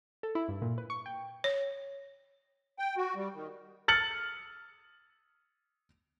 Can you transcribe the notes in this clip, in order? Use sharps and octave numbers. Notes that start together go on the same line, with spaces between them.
A4
E4
G2
A#2
B4
C#6
G5
C#5
G5
F#4
G3
D#3
F6 A6 C#7 F#7